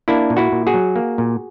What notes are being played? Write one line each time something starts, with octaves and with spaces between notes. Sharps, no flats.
A#3 D4 E4
A#2
E4 F#4
A#2
F#4 G#4
F#3
A#3
A#2